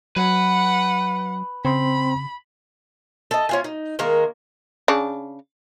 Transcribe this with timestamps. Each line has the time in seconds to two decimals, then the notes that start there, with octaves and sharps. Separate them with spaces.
0.16 F#3 B4 F#5
1.65 C#3 C4 B5 C6
3.31 A4 D#5
3.49 C#4 F4 G#5
3.64 D#4
3.99 D#3 G#3 A#3 A#4
4.88 C#3 D4